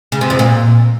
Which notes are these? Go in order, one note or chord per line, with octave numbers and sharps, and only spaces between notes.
C#3
C3
F2
A#2